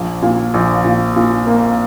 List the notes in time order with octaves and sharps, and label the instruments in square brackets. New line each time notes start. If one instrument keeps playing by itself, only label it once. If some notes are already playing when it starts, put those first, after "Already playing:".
Already playing: [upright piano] A#1
A#2
A#1
A#2
A#2
A#3